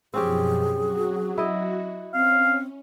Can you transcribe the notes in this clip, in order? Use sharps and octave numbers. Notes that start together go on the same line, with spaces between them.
F#2 B2 F3 C4 C#4 G4 G#4
F#3 F#4
E4 D#5
C4 C#4 F5